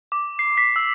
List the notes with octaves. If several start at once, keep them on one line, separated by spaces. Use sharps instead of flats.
D6
C7
B6
E6